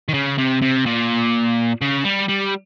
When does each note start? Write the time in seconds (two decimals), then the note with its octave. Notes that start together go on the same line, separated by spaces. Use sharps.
0.09 D#3
0.14 C#3
0.38 C3
0.62 C3
0.86 A#2
1.81 C#3
2.05 G3
2.29 G3